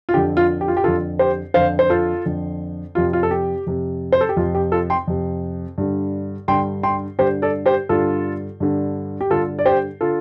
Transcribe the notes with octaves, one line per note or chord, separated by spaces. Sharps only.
F4
F2 D3 G4
F4
G4
F4
G4
F2 D3 F4 A4
G4 C5
F2 D3 C5 F5
C5
F4 A4
F2 D3
F2 C3 F4
F4
A4
G4
F2 C3
C5
A4
G4
F2 C3 F4
G4
F4 A4
G5 C6
F2 C3
G2 D3
G2 D3 G5 C6
G5 C6
G2 D3 G4 C5
A4 D5
G4 C5
G2 D3 F4 A4
G2 D3
G4
G2 D3 F4 A4
D5
G4 C5
D3 F4 A4